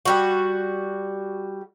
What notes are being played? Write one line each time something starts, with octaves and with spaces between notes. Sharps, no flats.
G3 F#4